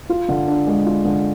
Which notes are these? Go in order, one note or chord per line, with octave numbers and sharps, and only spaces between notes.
F4
D3
D4
G#3
F4
D3